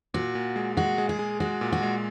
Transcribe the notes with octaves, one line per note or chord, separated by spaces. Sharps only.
A#2 F#4
A#2
G#3
G#3 F#4
G#3
G#4
G#3
G#3 F#4
A#2
F#4
G#3